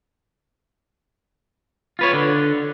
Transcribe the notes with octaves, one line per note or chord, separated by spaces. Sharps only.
F4 B4 C#5
D3